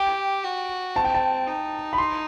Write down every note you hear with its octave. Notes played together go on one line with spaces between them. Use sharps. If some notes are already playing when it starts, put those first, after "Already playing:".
Already playing: G4 G5
F#4
C4 A5
G5
A5
D#4
B5
C6